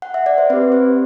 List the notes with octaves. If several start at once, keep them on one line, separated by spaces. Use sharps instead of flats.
F#5
E5
D5
C5
C4 G4 B4
C5